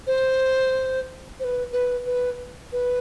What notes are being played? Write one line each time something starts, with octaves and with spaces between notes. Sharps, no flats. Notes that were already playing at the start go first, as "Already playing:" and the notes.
C5
C5
B4
B4
B4
B4